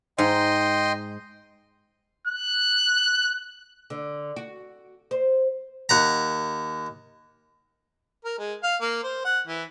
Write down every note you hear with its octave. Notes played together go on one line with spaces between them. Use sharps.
G#2 D#5 G5 C6
F#6
D3
F#4
C5
D#2 F#5 A#5
A#4
G#3
F5
A#3
C5
F#5
E3